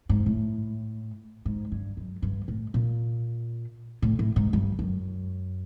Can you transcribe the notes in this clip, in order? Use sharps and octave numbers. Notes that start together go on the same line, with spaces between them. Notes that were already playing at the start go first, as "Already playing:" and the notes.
G#2
A2
G#2
G2
F#2
G2
A2
A#2
A2
A2
G#2
G2
F#2